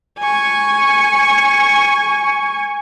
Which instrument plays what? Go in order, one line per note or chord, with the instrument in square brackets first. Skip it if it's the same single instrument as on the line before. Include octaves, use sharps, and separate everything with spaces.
[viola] G#5 C#6